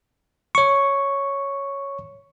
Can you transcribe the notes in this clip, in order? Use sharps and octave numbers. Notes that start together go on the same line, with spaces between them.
C#5 C#6